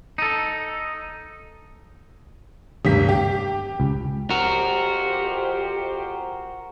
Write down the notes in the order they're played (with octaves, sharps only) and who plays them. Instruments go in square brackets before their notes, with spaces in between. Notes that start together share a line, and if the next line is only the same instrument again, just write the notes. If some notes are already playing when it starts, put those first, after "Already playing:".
[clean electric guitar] D#4 A4
[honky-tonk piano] G#1 C3 B6 [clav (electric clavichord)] D2 G2
[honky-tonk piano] G4
[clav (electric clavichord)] C#2
[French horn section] F2 G4 C5 [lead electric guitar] F#4 A#4